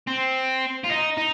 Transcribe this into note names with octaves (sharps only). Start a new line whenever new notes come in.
C4
F4
D#4
D#4